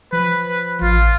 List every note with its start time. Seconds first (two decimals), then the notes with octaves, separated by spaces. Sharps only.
0.12 F3 B4
0.81 A1 F4